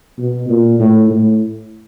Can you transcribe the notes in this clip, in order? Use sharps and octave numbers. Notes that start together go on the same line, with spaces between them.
B2
A#2
A2
A2